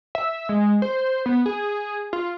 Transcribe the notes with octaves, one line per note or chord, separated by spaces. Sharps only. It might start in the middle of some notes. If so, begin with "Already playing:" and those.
E5
G#3
C5
B3
G#4
F4